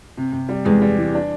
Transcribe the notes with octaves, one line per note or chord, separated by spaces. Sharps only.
C3
C3
G3
E2 G#3
G3
E3
D4